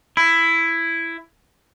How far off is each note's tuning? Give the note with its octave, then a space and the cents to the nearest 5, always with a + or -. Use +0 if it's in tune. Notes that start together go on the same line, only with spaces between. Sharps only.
E4 +10